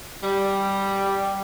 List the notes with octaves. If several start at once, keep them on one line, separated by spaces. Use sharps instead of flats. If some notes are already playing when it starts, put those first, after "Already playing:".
G3